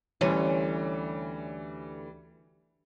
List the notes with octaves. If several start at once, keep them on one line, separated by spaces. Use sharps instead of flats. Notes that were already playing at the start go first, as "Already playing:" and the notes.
D2 E3 G3 C#4